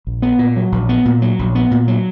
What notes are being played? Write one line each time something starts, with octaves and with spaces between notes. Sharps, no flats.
A#1
B3
A#2
F#3
A#1
B3
A#2
F#3
A#1
B3
A#2
F#3